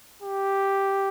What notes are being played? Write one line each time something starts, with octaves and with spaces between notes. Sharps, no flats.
G4